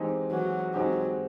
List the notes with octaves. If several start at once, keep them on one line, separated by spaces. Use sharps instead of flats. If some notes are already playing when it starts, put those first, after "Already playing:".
Already playing: E3 G#3 C4 D#4 G4
E3 F#3
F#3 G#3 C4 D#4 G4